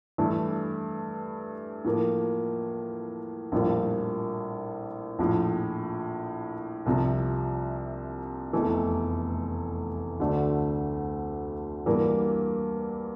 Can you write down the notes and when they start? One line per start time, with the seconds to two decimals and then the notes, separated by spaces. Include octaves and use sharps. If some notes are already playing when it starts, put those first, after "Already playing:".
0.18 G2 E3 A3 E4
1.85 A2 F3 A#3
3.52 A#1 A2 G3 A#3 F4
5.19 A#1 A2 F3
6.86 C2 C3 F3
8.53 F1 E2 E3 A3
10.20 D2 D3 A3 D4
11.86 G2 E3 G3 A#3